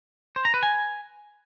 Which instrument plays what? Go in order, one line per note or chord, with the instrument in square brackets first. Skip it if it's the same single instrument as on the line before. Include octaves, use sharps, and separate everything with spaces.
[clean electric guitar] C5
A#5
B4
G#5